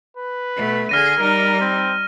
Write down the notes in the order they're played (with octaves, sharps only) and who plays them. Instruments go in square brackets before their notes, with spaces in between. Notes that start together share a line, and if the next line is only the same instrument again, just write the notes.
[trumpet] B4
[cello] B2 A3
[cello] D3 G#4 [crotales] F6 A#6 D#7
[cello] G3 D#4 [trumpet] A#4
[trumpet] C4